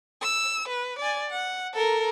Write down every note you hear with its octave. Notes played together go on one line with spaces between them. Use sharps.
E6
B4
D5 G#5
F#5
A4 A#4